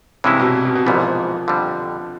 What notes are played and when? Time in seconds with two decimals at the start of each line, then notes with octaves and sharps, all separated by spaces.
0.24 G2 C3 E3 G#3 C#4 E4
0.40 B2
0.65 B2
0.76 B2
0.86 A#1 G#2 E3 F3 G3 B3
1.48 F2 D3 G3